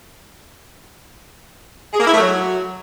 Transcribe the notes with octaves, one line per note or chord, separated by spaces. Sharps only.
G#4
A#3
E4
A3
F#3